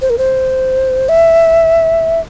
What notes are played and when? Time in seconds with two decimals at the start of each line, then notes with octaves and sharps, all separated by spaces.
0.01 C5
0.10 A#4
0.18 C5
1.09 E5